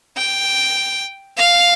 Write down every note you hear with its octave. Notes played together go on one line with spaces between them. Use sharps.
G5
F5